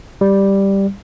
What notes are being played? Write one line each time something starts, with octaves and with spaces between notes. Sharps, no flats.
G3